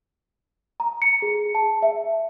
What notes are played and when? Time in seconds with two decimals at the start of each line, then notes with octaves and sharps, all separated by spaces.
0.80 A#5
1.02 C#7
1.22 G#4
1.55 A5
1.82 E5